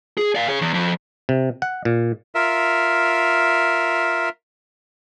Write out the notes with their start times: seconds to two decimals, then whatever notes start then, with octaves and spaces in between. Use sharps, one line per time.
0.17 G#4
0.35 D5 F5
0.48 G#4 C#5
0.61 E2
0.74 F2
1.29 C3
1.62 F#5
1.85 A#2
2.35 F4 A#4 E5